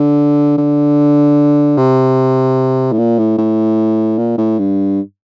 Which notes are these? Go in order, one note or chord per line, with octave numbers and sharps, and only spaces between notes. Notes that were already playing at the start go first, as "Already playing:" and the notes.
Already playing: D3
D3
C3
A2
A#2
A2
A2
A#2
A2
G2